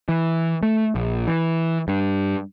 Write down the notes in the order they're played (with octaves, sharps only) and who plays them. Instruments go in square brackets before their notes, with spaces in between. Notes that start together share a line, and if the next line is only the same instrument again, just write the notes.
[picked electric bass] E3
A3
A#1
E3
G2